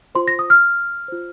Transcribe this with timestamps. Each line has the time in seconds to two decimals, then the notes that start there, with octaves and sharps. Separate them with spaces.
0.15 F4 C5 C6
0.28 A#6
0.39 D#6
0.50 F6
1.08 F4 C5